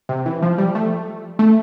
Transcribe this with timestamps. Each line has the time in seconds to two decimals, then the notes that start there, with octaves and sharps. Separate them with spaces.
0.09 C3
0.26 E3
0.42 F3
0.58 G3
0.75 A3
1.39 A3